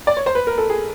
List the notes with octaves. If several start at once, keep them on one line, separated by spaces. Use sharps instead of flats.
D5
C#5
C5
B4
A#4
A4
G#4